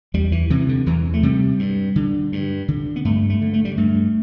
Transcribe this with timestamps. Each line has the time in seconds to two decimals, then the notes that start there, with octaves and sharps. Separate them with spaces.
0.14 E2 G3
0.32 E3
0.50 C3 E3
0.69 D3
0.86 E2 E3
1.14 A3
1.23 C3 G3
1.59 G2
1.96 D3
2.32 G2
2.68 D3
2.96 B3
3.05 G2 A3
3.30 A3
3.41 D3
3.53 A3
3.65 G3
3.76 G2 A3